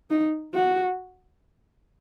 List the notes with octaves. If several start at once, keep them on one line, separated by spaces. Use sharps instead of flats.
D#4
F#4